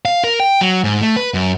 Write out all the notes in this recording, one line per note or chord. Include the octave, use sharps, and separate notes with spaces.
F5
A#4
G5
F#3
G#2
A3
B4
F#2